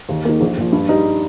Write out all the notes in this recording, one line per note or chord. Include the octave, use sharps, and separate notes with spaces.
D#2
D#3 A#3
A#1
A#2 F3
G2
G3 D#4